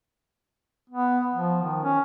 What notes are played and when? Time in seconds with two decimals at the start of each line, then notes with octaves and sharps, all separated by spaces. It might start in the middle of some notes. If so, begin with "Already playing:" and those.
0.90 B3
1.34 F3
1.62 D#3
1.83 C#4